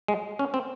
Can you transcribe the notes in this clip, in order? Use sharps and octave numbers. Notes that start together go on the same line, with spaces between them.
G#3
C#4
C4